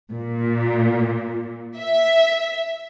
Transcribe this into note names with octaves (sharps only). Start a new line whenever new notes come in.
A#2
E5